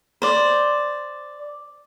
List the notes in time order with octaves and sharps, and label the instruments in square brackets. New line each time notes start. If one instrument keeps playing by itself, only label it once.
[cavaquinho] C5 D5